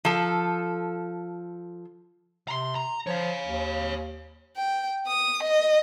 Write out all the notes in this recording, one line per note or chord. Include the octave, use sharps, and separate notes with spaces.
F3 A4
C3 A#5 C6
A#5
F3 C#5 F5
D#2
G5
D#6
D#5